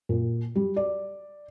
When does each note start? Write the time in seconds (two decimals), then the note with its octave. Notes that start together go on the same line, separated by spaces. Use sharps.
0.09 A#2
0.55 G3
0.76 D5